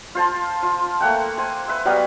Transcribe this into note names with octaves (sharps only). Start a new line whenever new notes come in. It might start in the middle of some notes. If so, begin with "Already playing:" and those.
F4 C5 A5
F4
A3 A#3 F#5 G5
C5 G#5
B4 E5
F#3 G3 B3 F5